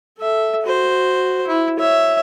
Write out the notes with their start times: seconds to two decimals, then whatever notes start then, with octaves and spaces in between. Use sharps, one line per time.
0.19 A4 E5
0.62 F#4 C5
1.47 E4
1.79 C#5 E5